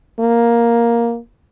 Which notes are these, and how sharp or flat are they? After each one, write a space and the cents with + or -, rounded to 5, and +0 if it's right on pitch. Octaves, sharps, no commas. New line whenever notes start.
A#3 +5